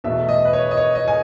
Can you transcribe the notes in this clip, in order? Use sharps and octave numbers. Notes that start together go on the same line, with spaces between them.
E2 B2 A3 E5
D#5
B4
C#5
D#5
C#5
D#5
G#5